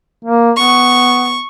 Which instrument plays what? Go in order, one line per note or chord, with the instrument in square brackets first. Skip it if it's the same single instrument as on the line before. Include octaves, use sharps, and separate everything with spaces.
[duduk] A#3
[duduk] B3 [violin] C#6